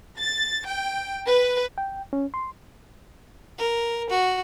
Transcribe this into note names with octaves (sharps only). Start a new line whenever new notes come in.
A6
G5
B4
G5
C#4
C6
A#4
F#4